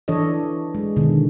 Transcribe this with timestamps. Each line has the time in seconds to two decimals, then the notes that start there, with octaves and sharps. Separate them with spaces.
0.08 E3 D4 A4 C#5 D#5
0.75 G#3
0.96 B2 D3 D#3